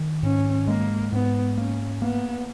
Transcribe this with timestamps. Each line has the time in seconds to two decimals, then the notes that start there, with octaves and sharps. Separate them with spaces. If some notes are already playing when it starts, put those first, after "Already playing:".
Already playing: D#3
0.23 G#2 C#4
0.67 G#3 A#3
1.12 G#2 B3
1.57 A#3 C#4
2.02 A#3 B3